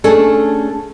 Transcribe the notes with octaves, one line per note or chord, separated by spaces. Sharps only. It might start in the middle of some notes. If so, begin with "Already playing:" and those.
A3 C#4 D4 G#4 A4